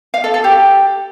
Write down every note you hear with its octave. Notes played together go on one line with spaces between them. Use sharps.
F5
A4
A4
G4